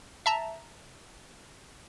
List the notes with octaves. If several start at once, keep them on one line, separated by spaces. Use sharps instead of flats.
E5 A5 A#5